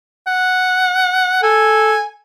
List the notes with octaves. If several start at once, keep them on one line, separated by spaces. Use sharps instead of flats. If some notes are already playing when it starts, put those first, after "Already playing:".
F#5
A4 G#5